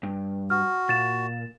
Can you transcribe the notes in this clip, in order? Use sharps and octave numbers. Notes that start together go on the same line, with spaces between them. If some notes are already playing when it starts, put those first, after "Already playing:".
G2
F#4 F6
A#2 A6 E7